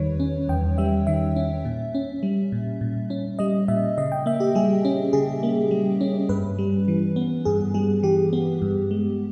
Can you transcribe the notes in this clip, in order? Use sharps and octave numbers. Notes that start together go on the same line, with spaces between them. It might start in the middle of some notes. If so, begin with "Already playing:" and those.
Already playing: E2 D#3 G3 B4 C#5
C#4
E2 G5
G3 E5
D#3 E5
C#4
A#2
C#4
G3
A#2
A#2
C#4
G3 D#5
A#2 E5
C#3 D#5
G5
A#3 E5
G4
G3 G#4
C#4
C#3 G#4
A#3
G3
C#4
G2 B4
G3
E3
B3
G2 G#4
G3 G#4
E3 G4
B3
G2
G#3